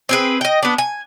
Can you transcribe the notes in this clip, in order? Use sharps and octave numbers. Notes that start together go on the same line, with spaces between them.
C4 G#4 B4
D#5 G5
B3 D4
G#5